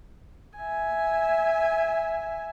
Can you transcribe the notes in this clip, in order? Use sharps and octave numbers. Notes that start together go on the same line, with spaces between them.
E5 G#5